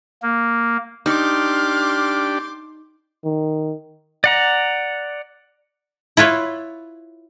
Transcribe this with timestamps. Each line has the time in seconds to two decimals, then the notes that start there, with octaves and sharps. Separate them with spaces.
0.23 A#3
1.06 D4 D#4 G4 C6 D6 F6
3.24 D#3
4.24 D5 F#5 A#5
6.17 E4 F4 B4 C#5